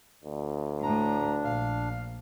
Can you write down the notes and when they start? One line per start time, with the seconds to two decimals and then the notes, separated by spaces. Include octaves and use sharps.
0.24 D2
0.83 A2 D4 A#5
1.45 A#1 F5